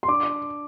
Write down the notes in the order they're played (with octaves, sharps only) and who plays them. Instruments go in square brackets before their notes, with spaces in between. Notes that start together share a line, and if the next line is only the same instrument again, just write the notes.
[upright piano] C6
D4 D6